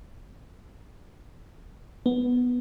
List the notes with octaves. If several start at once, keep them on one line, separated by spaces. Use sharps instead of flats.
B3